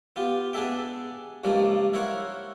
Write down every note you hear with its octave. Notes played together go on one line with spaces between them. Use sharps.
B3 F4 G4
B3 D4 G#4 A4 E5 G5
C#2 G2 F3 G3 A#3 D5
E4 A#4 C5 C#5 F5 F#5